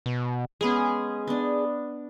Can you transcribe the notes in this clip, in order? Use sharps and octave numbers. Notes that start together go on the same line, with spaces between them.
B2
G#3 B3 C#4 G#4
B3 D4